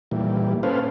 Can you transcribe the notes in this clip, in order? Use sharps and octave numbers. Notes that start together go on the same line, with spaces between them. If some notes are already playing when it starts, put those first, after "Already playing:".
A#2 E3 G3
C#4 A4 B4 C5 F5